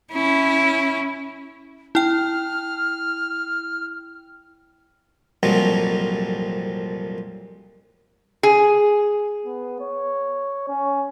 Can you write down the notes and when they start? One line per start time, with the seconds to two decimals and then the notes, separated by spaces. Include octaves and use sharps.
0.12 C#4 E4
1.95 E4 G5 F6
5.43 C2 F2 A#2 F3 F#3
8.43 G#4
9.45 B3
9.80 C#5
10.68 C#4